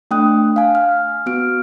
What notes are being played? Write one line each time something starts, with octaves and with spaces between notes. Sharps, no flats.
A3 D4 G5 D#6 F#6
F5 G#5
F6
B3 F#4 F6 D7